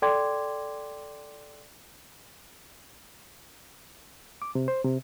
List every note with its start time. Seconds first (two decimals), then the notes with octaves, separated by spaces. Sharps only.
0.02 A4 D5 G5 C6 D6 G#6
4.42 D6
4.55 C3
4.68 C5
4.85 C3